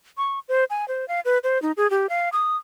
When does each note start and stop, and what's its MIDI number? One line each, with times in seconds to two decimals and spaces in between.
0.17 0.39 85
0.48 0.64 72
0.70 0.87 80
0.88 1.07 72
1.08 1.20 77
1.25 1.38 71
1.44 1.61 72
1.62 1.72 63
1.77 1.90 68
1.90 2.09 67
2.09 2.29 77
2.33 2.56 87